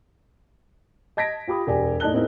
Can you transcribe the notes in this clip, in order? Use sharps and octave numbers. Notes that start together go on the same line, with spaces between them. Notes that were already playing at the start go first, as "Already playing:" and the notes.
D#5 A5 G#6 A#6 B6 D7
F4 G4 B5 D#6
E1 G4 D5 G#5
A2 D#4 D5 A5 F#6 G7
B3 C4 D#4 E4 G#4 A#4